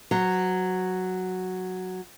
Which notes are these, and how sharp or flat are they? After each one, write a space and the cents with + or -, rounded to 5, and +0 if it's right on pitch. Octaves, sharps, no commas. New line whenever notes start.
F#3 +0 C5 -15